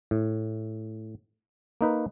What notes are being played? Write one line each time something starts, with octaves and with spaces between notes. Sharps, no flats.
A2
A#3 D#4 B4